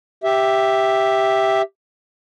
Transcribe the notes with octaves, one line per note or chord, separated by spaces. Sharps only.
G4 E5